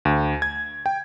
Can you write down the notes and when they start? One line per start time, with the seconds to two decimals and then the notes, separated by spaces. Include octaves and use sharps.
0.05 D2
0.42 G#6
0.86 G5